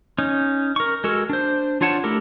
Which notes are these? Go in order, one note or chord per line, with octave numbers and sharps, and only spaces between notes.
C#4 D#4
A#4 C#6
G#3 F#4 A4 A#4
D4 C5
D4 F4 C#5 F#5 A5
A3 D4 E4 G4 A#4